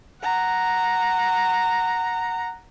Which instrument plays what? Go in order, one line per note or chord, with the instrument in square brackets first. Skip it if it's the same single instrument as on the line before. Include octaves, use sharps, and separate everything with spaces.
[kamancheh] F#5 A#5